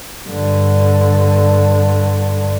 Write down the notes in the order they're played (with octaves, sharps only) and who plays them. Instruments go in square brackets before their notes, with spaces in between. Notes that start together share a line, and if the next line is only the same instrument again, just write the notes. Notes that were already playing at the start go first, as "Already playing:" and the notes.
[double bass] G2 D3